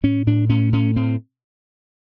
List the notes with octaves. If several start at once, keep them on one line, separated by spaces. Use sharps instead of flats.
A2 C#4
A2 D4
A2 C#4
A2 C#4
A2 C4